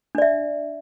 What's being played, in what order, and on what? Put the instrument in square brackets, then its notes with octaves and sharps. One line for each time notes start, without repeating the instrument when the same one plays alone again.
[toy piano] D4
D5
E5